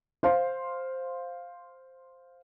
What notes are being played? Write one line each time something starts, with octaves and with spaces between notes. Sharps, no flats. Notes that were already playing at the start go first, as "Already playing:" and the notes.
C5 F5 C6